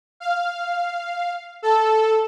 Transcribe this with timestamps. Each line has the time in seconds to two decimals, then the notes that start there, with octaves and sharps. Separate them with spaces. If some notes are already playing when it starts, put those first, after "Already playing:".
0.20 F5
1.62 A4